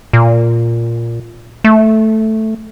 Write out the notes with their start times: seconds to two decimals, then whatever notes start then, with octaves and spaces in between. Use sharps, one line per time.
0.13 A#2
1.64 A3